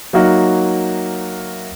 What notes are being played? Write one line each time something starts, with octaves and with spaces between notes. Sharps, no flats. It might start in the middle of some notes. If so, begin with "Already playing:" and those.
F#3 A#3 D#4 F#4 A#4 E5